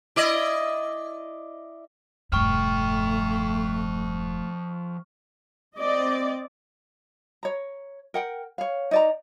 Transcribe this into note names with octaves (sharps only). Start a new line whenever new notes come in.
E4 D5 D#5
E1 G2 F3 A3 G5 C#6 F6
C4 D5 D#5
C#5 A#5
A#4 F#5 G5
C#5 F5
D#4 D5 A#5